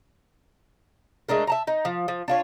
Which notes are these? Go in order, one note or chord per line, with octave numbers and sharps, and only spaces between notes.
G#3 A3 D4 A#4
E5 A5 A#5
D#4
F3
F3
D4 F4 C#5